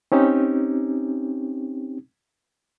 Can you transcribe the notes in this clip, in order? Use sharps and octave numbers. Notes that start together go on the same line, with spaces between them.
C4 C#4 D#4 G4